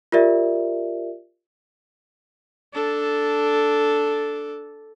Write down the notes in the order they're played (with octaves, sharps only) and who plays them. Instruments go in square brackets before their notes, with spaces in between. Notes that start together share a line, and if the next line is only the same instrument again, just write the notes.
[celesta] F4 G4 A#4 D5 E5
[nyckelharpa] D4 A4